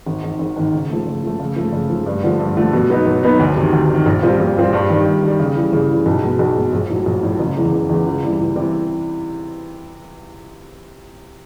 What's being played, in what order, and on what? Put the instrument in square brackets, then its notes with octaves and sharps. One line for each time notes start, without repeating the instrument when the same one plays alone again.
[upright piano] G#1
G#2 D#3
G#1
G#2 D#3
C#3
F3 A3
C#3
F3 A3
C#3
F3 A3
C#3
F3 A3
G2
D3 F3 A3
G2
D3 F3 A3
B2
F#3 B3 D#4
B2
F#3 B3 D#4
D2
C3 D#3
D2
C3
D#3
A#1
A#2 G3 C4 F4
A#1
A#2 G3 C4 F4
G2
D#3 G3
G2
D#3 G3
C#3
E3 G3
C#3
E3 G3
B1
B2 G#3
B1
B2 G#3
A#1
A2 F#3
A#1
A2 F#3
F#1
E2 C#3 E3 G#3
F#1
E2 C#3 E3 G#3
C#2
C3 E3 G3
C#2
C3 E3 G3